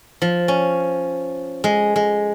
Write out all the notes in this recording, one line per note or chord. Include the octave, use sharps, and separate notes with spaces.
F3
C#4
G#3
G#3